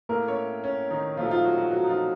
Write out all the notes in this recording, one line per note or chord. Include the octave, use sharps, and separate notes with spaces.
A2 A3 A#3 A#4
C#4 C#5
C#4
D#3 D#4
A#2 F3 F#3 A3 F4
D#4
F3 F4
F#3 F#4
F#3 F#4
F#3 F#4
D#4
F3 F4